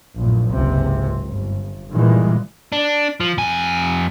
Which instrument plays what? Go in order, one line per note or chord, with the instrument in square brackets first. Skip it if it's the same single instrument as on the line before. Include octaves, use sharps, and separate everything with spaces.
[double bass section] A#1 F#2 A2
F#1 C#2 G#2 C3
G1
A#2 D#3 E3 G3 G#3
[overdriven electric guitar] D4
F3
F2 G#5